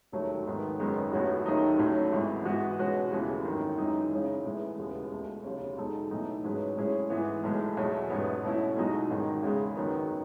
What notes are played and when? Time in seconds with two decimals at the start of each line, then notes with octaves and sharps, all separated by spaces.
0.12 E1 D#2 D#3 F#3 A3
0.46 G#2 D#3 G#3 B3
0.79 F#1 F#2 D#3 G#3 B3
1.12 A1 A2 F#3 B3 F#4
1.46 D#2 D#3 F#3 A3 D#4
1.78 A1 A2 F#3 C#4
2.12 G#1 G#2 E3
2.45 G#2 E3 B3 F#4 B4
2.79 B2 G#3 C#4 F#4 B4
3.12 D#2 C#3 E3 A3
3.45 G#1 F#2 D#3
3.78 F#2 E3 G#3 D#4
4.11 C#3 G#3 C#4 E4
4.45 A2 E3 G#3 B3 E4
4.78 E1 D#2 C#3 G#3 B3
5.11 C#2 B2 A3
5.44 E1 D#2 C#3 F#3 C#4
5.77 E2 B2 G#3 D#4 A4
6.11 B1 A2 E3 A3 D#4
6.44 G#2 F#3 C#4 G#4 B4
6.77 A2 G#3 C#4 E4 G#4
7.10 G#2 E3 B3
7.44 B1 A2 G#3
7.77 E2 B2 F#3 A3
8.10 A1 G#2 F#3 B3
8.43 B2 A3 C#4 E4
8.77 B1 B2 G#3 D#4 F#4
9.10 A1 G#2 D#3
9.43 E2 C#3 G#3
9.76 F#1 F#2 D#3 F#3 B3